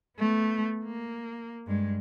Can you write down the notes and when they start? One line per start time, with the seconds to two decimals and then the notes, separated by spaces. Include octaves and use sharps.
0.18 A3 B3
0.84 A#3
1.67 G2 G#3